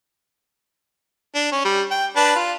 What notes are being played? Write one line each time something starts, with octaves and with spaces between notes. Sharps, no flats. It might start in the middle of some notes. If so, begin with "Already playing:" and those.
D4
C#4
G3
G5
D4 B4 A5
F4